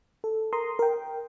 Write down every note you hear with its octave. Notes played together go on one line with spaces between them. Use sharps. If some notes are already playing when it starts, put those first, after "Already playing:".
A4
A#4 A#5 C6 D#6
A#4 G5